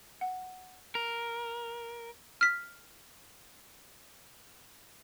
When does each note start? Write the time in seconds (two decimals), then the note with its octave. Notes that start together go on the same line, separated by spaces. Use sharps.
0.21 F#5
0.95 A#4
2.41 F6 B6